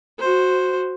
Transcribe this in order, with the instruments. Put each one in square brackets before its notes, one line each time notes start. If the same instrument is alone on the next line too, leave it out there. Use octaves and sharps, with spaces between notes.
[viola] F#4 C5